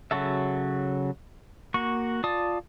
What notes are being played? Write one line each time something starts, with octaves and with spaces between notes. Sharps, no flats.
C#3 F#3 F#4 A4 E5
A#3 F#4 C#6
F4 D5 A5 D#6